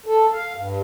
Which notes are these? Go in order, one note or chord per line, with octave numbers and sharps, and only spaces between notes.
A4
F5
G2